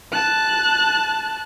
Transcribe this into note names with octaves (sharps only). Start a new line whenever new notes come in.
A5 F#6